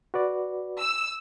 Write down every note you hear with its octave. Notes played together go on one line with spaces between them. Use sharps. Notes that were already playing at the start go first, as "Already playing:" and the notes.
F#4 B4 D5
E6